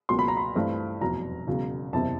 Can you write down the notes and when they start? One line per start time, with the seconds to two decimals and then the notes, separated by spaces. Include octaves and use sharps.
0.09 C#2 B2 F#3 A#3 C6
0.19 B5
0.28 A#5
0.37 B5
0.55 G2 E3 A3 C4
1.01 F1 E2 B2 F#3 A#5
1.47 E1 E2 C#3 F#3
1.93 F#1 E2 C3 E3 A5